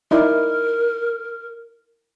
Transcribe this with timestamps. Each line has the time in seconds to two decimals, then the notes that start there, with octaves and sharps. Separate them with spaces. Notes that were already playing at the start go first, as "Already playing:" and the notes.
0.11 D#4 E4 A#4 D5